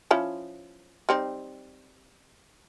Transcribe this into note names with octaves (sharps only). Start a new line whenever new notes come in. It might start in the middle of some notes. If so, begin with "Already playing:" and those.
F3 C#4 E4
G3 C4 D#4